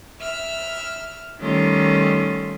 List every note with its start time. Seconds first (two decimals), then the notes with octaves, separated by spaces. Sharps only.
0.21 E5 F6
1.40 D#3 G3 A3 C#4 F4